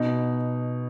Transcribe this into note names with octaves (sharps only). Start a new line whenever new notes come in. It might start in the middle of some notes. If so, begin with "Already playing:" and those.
Already playing: B2 D#4